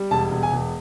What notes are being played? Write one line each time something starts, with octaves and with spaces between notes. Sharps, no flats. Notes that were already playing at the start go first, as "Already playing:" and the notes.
Already playing: G3
E1 A5
E1
G#5
E1